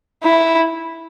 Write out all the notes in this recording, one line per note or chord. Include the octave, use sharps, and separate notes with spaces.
E4